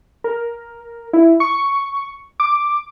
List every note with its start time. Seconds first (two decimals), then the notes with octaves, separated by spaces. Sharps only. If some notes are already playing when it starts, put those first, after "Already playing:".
0.24 A#4
1.13 E4
1.40 C#6
2.40 D6